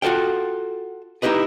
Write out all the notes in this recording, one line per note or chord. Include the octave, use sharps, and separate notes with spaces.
F4 F#4 A4 F5 G5
D#4 E4 G4 B4 D#5